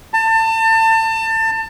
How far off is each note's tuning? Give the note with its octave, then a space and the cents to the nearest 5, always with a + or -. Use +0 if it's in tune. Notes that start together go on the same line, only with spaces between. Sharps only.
A5 +30